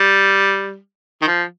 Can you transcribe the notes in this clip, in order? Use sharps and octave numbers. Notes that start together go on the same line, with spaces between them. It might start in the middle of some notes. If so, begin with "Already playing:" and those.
Already playing: G3
D#3
F3